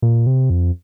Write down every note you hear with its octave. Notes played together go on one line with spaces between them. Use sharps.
A#2
C3
F2